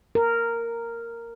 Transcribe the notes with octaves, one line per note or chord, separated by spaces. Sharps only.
A#4